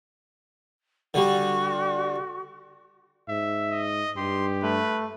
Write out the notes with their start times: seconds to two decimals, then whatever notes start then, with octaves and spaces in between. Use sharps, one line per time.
1.14 D3 G3 F#4
3.29 G#2 E5
3.70 D#5
4.17 G2 G4 C6
4.63 A3 B4